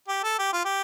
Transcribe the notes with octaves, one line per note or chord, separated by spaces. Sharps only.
G4
A4
G4
F4
G4